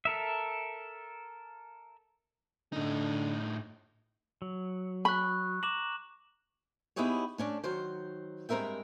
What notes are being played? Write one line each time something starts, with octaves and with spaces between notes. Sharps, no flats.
A4 A#4 E5
A2 D3 D#4
F#3
B5 C#6 F#6
A#5 D6 E7 F#7
B3 D#4 E4 G4 G#4 C#5
A3 C#4 D4
D#3 F#3 C5
G2 G#3 C4 A#4 E5 G5